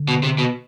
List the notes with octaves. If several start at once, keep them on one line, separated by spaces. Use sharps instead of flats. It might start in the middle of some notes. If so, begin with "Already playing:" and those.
Already playing: D3
B2
C3
B2